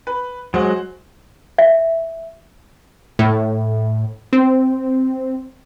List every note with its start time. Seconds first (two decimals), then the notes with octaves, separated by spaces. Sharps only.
0.07 B4
0.54 F#3 G#3 F#4 C5
1.58 E5
3.19 A2
4.33 C4